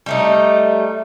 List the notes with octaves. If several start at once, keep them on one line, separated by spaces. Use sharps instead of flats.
G3 A3 D#4